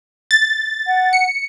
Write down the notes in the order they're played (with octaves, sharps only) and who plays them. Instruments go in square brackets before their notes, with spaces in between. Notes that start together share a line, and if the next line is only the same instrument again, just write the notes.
[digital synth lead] A6
[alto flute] F#5
[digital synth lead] C#7